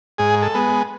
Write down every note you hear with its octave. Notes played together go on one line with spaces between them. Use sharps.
G#2 G#4
A4
G#3 B3